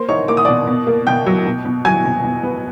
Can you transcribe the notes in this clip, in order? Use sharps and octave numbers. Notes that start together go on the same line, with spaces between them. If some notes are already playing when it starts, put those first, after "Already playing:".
Already playing: A#3 C5 C6
D#4 C#5 C#6
A#3 D6
D#6
B2 D5 D6
B2
A#3
B2 G5 G6
F#3
B2
B2
F#3 G#5 G#6
B2
B2
B3